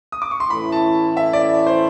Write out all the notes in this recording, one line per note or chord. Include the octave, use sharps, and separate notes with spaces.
D#6
D6
C#6
C6
A2 E3 A3 C#4 E4 B5
A5
E5
D5
C5